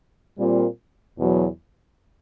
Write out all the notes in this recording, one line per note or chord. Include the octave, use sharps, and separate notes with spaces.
A#2 G3 C4 F4 A#4
E2 B2 F#3